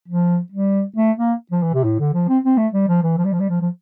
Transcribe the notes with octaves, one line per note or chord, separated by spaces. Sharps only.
F3
G3
A3
A#3
F3
E3
C3
A2
D3
F3
C4
C4
A3
G3
F3
E3
F3
G3
F3
G3
F3
F3